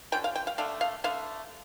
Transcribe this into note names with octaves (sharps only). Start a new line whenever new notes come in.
D3 F3 C#4 G5
F5
G5
F5
D3 A3 D4 F5
F5
D3 A3 D4 F5